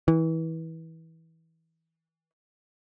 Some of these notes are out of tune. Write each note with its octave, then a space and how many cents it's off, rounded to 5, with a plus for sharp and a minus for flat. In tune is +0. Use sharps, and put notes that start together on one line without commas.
E3 -25